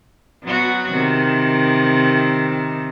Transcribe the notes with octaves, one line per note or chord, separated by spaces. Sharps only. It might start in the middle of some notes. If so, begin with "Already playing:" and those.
F#3 B3 F#4
C3 D#3